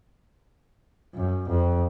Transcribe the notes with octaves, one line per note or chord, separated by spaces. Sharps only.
F#2
F2